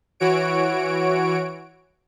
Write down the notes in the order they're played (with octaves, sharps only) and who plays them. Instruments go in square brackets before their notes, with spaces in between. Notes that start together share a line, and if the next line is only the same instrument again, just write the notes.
[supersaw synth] E3 F#4 C#5 D7